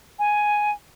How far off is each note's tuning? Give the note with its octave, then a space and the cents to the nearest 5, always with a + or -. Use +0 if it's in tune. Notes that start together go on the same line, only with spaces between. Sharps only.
G#5 +5